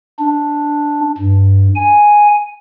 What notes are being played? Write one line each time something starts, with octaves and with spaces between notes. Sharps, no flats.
D4
G2
G#5